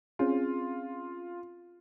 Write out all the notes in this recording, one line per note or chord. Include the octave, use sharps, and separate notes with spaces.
C4 C#4 F4 G#4